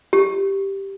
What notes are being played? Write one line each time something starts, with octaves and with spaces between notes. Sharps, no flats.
G4